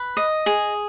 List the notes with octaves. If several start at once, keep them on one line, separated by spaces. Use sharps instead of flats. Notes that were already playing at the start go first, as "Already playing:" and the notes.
Already playing: B4
D#5
G#4